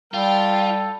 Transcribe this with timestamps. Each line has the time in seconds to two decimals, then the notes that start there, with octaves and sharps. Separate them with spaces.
0.14 G3 F4 A4 G5